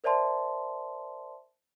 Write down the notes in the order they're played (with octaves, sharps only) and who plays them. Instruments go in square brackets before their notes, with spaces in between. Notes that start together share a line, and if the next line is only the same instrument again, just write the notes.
[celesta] A#4 C5 D5 E5 A5 C6